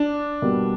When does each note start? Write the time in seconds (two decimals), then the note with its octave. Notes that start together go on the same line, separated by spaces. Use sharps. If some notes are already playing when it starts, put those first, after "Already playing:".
Already playing: D4
0.42 B2 G3 A#3